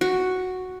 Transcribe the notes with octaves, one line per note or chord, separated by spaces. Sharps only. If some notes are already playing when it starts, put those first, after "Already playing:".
F#4